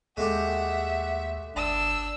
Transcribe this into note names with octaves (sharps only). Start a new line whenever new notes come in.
D#2 G#3 A3 G4 E5 F#5
G1 D4 E6